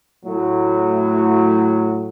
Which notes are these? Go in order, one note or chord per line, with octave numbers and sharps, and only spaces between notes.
A2 F#3